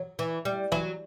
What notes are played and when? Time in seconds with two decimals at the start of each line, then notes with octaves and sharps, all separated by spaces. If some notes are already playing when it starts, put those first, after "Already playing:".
Already playing: F#3
0.19 E3
0.45 G3
0.72 E3 F#3 E4